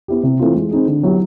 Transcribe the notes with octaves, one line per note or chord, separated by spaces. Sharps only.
B3 E4 G4
C3
E3 A3 C4 F4
G#3
C4 D#4 G#4
D3
F#3 B3 E4 G4